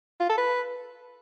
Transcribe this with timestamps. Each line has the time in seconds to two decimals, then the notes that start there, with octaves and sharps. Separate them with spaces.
0.20 F4
0.29 A4
0.38 B4